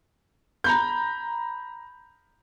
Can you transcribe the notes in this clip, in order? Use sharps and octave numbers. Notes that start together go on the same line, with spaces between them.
A#5 B5 G6